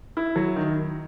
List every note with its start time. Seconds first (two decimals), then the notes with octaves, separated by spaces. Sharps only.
0.17 E4
0.36 F#3
0.56 D#3